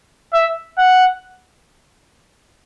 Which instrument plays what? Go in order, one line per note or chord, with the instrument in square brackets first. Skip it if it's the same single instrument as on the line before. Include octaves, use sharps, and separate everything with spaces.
[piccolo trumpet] E5
F#5